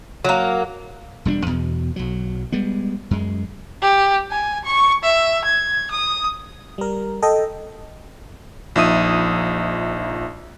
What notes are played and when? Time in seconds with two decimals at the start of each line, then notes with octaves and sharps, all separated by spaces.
0.25 F#3 A#3
1.25 E1 G3 C#4 D4
1.46 E2 B2
1.96 B1 F#3
2.52 G3 G#3 B3
3.11 F#2 G#3
3.82 G4
4.30 G#5
4.65 C#6
5.03 E5
5.44 G#6
5.91 D#6
6.78 G3 A#4
7.22 A4 D#5 G5
8.76 A#1 F3 D#4 E5 D#6 D#7